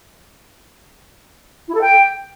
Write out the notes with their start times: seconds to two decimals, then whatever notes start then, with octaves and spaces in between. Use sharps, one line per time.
1.68 E4
1.74 A4
1.81 G5